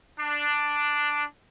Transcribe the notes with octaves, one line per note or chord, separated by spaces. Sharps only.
D4